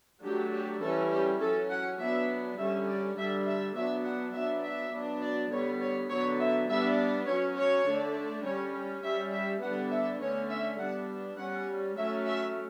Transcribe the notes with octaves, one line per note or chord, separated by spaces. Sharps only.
F#3 A3 D4 G4
G4
E3 G3 C#4 A4
G4
F#3 C#4 A4
F#5
F#3 B3 D4 E5
D3 G3 C#4 E5
D5
D3 G3 D4 E5
E5
F#3 B3 D4 E5
F#5
F#3 B3 D4 E5
E5
F#3 B3 D4
D5
D3 G3 B3 C#5
C#5
D3 F#3 B3 C#5
E5
G3 B3 D4 E5
F#3 C#4 C#5
C#5
D3 A3 D4
G3 C#4 C#5
G3 C#4 E5
E5
D3 G3 B3 D4 F#5
E5
D3 A3 C#4 C#5
E5
G3 B3 D4 F#5
G3 C#4 F#5
F#3 A3 C#4 E5
E5